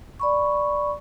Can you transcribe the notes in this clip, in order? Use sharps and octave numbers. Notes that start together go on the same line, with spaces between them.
D5 B5 C#6